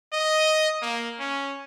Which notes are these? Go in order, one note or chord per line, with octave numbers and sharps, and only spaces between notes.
D#5
A#3
C#4